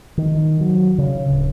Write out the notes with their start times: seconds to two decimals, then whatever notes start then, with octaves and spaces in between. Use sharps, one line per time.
0.18 D#3
0.61 F#3
0.98 C#3
1.30 D1